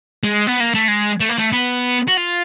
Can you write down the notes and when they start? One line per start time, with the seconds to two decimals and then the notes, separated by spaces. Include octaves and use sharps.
0.23 G#3
0.47 B3
0.60 A#3
0.74 A3
0.88 G#3
1.20 A3
1.29 A#3
1.38 A3
1.52 B3
2.08 F#4
2.17 F4